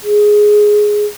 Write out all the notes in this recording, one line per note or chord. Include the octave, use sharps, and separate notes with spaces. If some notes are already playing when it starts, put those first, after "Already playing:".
G#4